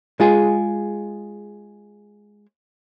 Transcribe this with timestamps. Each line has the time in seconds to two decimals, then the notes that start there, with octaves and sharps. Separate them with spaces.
0.20 G#3 F4 G#4